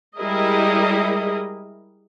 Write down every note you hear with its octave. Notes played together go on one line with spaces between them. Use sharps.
G3 G#3 E4 G#4 A#4 D#5